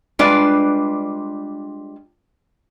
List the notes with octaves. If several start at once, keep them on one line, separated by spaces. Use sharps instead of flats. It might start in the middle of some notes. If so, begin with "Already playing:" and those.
G3 G#3 D4 F4 B4 D5